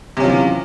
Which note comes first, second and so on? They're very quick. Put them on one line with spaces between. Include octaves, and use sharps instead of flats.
C3 C#4 F4 E3